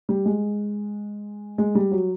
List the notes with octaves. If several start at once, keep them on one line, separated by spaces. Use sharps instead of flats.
G3
G#3
G#3
G3
F#3